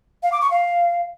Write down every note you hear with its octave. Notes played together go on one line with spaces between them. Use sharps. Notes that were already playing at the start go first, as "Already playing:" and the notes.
F5
D6
C#6
F5